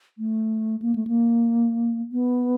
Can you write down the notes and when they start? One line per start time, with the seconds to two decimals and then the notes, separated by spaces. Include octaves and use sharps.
0.18 A3
0.82 A#3
0.95 A3
1.07 A#3
2.12 B3